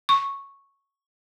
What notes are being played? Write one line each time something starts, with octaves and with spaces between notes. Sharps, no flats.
C#6